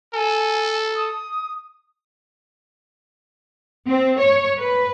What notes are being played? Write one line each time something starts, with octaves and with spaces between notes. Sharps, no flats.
A4 G#5
D#6
C4
C#5
B4